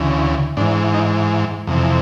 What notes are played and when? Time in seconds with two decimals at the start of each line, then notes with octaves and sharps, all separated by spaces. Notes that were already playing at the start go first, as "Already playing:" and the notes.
Already playing: D2 C#3 E3
0.57 G#2 D4
0.60 E3
0.94 D#4
1.67 F2 C3 E3